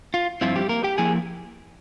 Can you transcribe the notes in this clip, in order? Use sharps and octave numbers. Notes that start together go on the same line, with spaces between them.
F4
G2 F3 C4 E4 F4
G3 G4
A#3 A#4
G4 G5
F3 A#3 E4 G#4 G#5